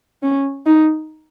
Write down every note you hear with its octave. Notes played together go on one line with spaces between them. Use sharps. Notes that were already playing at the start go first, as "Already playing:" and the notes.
C#4
D#4